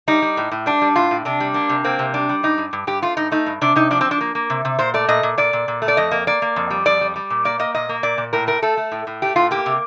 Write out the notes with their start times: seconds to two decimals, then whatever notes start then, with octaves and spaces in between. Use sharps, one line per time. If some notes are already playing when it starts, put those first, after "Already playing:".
0.08 G3 D#4
0.22 G3
0.37 A2
0.51 A2
0.66 G3 D4
0.81 G3
0.96 A2 F4
1.11 A2
1.25 C3 D4
1.40 G3
1.54 A#3 D4
1.69 C3
1.84 A#3 C4
1.99 C3
2.14 G3 D4
2.29 G3
2.43 G2 D#4
2.58 G2
2.73 G2
2.87 G2 G4
3.02 A3 F4
3.17 G2 D#4
3.32 A3 D#4
3.46 G2
3.61 C3 D4
3.76 C3 D#4
3.91 F3 D4
4.01 C4
4.05 F3
4.11 D4
4.21 A#3
4.35 A#3
4.50 C3
4.65 C3
4.79 A#2 C5
4.94 A3 D5
5.08 A#2 D#5
5.23 A#2
5.38 A#2 D5
5.53 A#2
5.68 A#2
5.82 A3
5.88 D5
5.97 F2 D#5
6.11 A#3
6.27 A#3 D5
6.42 A#3
6.56 F2
6.70 G3
6.85 F2 D5
7.01 G3
7.16 G3
7.30 A#2
7.45 A#3 D5
7.59 A#3 D#5
7.74 A#2 D#5
7.89 A#3
8.03 A#2 D5
8.18 A#2
8.33 A2 A#4
8.47 A3 A#4
8.62 A3 A4
8.77 A3
8.92 A2
9.07 A2
9.22 A3 G4
9.36 A2 F4
9.51 A#3 G4
9.66 C3